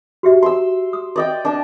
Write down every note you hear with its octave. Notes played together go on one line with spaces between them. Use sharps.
F#4 G4 E5
C6 E6
D#6
D5 D#5 G5
D4 A5